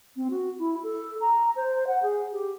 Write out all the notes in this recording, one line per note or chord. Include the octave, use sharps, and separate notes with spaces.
C4
F#4
E4
A4
A#5
C5
F#5
G#4
G4